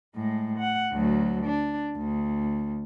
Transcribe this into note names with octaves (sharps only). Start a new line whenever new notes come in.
A2 G#3
F#5
D2 F#3
D4
D2